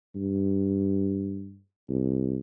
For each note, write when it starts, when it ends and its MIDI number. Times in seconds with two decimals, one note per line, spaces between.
0.15 1.60 43
1.89 2.38 36